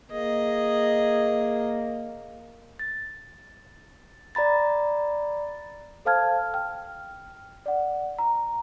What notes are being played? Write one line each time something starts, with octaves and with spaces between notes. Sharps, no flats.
A#3 G#4 D#5
A6
D5 A#5 B5 A6
A4 C5 F5 A5 F6 G#6
G5 F6
D5 F#5
A#5